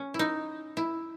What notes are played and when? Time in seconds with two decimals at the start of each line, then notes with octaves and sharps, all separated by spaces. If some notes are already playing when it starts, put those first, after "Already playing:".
Already playing: C#4
0.14 E4
0.19 D#4
0.77 E4